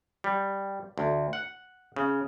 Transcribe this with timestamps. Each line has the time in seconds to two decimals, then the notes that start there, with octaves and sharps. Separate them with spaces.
0.24 G3
0.98 D2
1.33 F#5
1.96 C#3